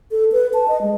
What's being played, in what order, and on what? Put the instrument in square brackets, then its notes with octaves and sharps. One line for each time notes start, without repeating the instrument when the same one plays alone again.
[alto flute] A4
B4
A5
D#5
G#3